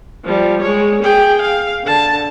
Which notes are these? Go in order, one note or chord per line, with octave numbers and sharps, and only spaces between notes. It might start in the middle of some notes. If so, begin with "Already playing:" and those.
F3 G3
G#3 C#5
G#4 G5
F5
D3 A5